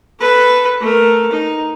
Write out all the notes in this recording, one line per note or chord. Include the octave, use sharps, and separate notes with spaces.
A4 B4
A3 A#4
D#4